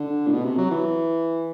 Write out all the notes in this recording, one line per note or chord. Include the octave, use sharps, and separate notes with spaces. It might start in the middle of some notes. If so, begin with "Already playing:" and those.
Already playing: D3
A2
B2
C3
F#3
E3